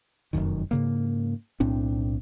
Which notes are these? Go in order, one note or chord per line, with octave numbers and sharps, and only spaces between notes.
F1 B1 F#2 D#3
G#2 C#3 A#3
B1 A2 C4 D4